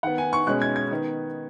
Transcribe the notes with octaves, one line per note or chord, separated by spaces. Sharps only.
D#3 B3 F#5
G#5
C#6
B2 G#3 C#4 F#6
G#6
G#6
D#3 B3